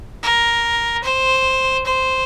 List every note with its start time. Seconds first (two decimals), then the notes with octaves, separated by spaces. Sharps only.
0.23 A#4
1.04 C5
1.85 C5